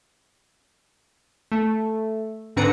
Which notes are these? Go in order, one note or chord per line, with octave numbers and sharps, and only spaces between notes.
A3
G#2 D3 C4 B4 A#5 C#7